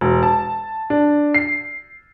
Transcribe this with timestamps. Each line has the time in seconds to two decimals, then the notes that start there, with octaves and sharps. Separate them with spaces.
0.01 E1
0.23 A5
0.90 D4
1.34 C7